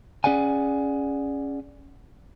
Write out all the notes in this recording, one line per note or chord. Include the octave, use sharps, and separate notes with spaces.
C#4 G#4 D5 F#5 G#5